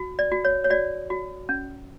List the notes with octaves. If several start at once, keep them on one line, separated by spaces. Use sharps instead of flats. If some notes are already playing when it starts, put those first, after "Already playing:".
Already playing: F#4
D5
F#4
C#5
C#5
F#4 D5
F#4
C#4